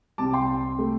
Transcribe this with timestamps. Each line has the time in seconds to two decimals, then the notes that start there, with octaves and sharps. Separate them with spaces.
0.18 C2 C3 G3 C4 A5 D6
0.33 G5 C6
0.79 C3 A3